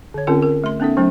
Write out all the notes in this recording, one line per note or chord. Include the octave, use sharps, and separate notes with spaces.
D3 C#5
D3 C4 C#4 F4 A#4
A#4
A3 C6
B3 C#4 D#4 A4 E5
F#3 A3 C#4 D#4